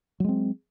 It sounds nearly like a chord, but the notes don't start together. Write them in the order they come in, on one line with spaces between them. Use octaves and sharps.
F#3 G#3 C4